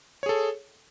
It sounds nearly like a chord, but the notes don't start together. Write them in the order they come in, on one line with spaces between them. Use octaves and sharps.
C#5 G#4 A4